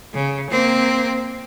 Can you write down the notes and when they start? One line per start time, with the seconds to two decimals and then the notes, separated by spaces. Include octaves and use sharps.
0.14 C#3
0.50 A#3 C4